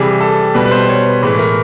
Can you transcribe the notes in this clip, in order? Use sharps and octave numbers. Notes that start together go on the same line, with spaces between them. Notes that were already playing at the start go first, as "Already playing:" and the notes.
Already playing: C3 E3 G3 G#4
A4
B2 G3 B4
B4
C5
C#5
B4
A2 E3 G#3 B4
A#4